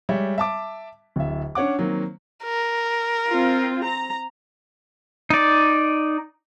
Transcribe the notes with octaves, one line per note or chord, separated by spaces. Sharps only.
G3 G#3 C#5 E5
E5 A5 D6
D1 E5
C#4 D4 C#5 F#5 D6
D#3 F#3 A#3 C4
A#4
C4 F4
A#5
D#4 D5